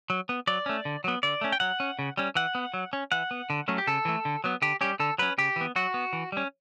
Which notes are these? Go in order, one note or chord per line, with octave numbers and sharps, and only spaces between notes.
F#3
B3
F#3 D5
A3 C#4
D3
F#3 B3
D3 D5
A3 C#4
G5
F#3 F#5
C#4
C#3
G3 C#4
E3 F#5
B3
F#3
C#4
E3 F#5
B3
D3
F#3 A3 C#4
G4
C#3 A4
E3 A3
D3
F#3 B3
D3 G4
G3 C#4 G4
D3 A4
F#3 C#4 B4
C#3 G4
E3 B3
F#3 F#4
B3
E3
G3 C#4